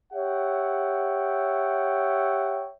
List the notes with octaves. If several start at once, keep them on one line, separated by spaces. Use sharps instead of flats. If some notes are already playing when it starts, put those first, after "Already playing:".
G4 C#5 E5 F#5 G5